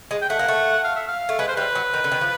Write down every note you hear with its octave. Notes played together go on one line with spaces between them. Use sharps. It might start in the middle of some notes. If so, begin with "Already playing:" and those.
G#3
G5
A3 F#5
A#3
A3
F5
E5
F5
A3
G#3 B4
C5
G3 B4
F#3
D#3
D3
D#3
F3